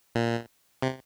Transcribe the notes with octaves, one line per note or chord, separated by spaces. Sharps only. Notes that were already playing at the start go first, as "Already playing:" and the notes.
A#2
C3